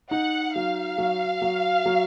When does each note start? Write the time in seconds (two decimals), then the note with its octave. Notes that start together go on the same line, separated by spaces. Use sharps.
0.11 D#4 F#5
0.55 F#3 F5
0.98 F#3
1.42 F#3
1.86 F#3